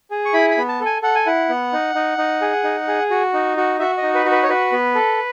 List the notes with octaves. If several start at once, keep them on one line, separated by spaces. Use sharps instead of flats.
G#4
C#6
E4 B5
B5
B3
A5
A4
G#5
A4 F#5
G#5
E4 F#5
B3
D#4
D#4
D#4
G#4
D#4
G#4
F#4
D#4
F#4
F#4 E5
D#5
D#4
B4
F#4
B4
C#5
F#4 B4
B3
A4